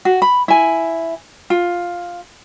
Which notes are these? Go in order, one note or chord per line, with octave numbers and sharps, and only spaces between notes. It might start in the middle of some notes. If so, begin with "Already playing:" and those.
F#4
B5
E4 G#5
F4